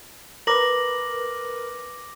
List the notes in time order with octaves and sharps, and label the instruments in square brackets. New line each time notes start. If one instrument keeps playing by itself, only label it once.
[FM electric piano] A#4 B4 [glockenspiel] D6 A#6 F#7